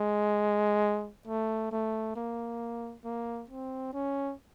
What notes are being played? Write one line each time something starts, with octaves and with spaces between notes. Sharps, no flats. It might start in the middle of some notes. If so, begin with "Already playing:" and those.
Already playing: G#3
A3
A3
A#3
A#3
C4
C#4